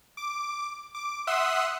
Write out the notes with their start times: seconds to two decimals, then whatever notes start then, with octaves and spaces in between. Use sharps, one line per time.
0.17 D6
0.95 D6
1.27 E5 F#5 C6 D#6 E6 F#6